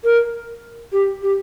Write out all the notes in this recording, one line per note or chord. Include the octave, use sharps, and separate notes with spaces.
A#4
G4
G4